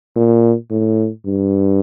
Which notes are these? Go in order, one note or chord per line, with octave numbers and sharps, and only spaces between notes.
A#2
A2
G2